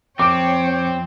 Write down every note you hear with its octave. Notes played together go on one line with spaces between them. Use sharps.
F2 C4 C#5 G5 D6 D7